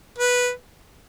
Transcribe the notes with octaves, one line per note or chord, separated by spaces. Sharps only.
B4